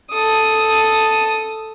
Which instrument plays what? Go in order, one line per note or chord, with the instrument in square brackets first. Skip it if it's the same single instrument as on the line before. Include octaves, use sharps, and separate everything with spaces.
[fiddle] A4 D#6